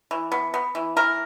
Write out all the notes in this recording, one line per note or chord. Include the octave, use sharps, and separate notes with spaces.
E3
B3
B3
E3
E3 A#4